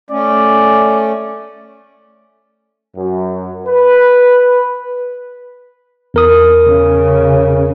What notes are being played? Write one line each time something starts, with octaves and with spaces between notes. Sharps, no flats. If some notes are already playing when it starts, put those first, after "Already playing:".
A3 C#4 D5
F#2
B4
E2 A#4 D#6
C#3